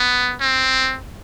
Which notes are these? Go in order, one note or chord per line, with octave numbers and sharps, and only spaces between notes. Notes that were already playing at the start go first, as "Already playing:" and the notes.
Already playing: B3
C4